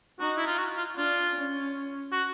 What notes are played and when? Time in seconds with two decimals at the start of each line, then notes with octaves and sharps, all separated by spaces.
0.20 D#4 F#4
0.37 E4
0.47 F4
0.58 F#4
0.77 F4
0.97 D4 F4
1.35 C#4
2.12 F#4